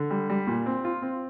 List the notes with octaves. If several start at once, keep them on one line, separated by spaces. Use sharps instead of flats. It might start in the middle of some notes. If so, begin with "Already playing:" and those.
Already playing: D3
G3
G3
A#2
C4
F4
C4